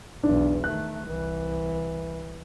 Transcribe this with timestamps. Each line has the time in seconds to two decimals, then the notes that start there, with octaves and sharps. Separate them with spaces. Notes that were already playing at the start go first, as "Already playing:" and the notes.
0.23 B1 E2 D4
0.64 D#3 A3 F#6
1.06 C2 E3